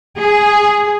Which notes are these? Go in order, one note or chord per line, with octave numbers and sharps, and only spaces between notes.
G#4